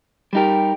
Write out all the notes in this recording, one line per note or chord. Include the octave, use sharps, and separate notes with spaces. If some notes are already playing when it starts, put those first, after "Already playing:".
G3 D#4 G4 A#4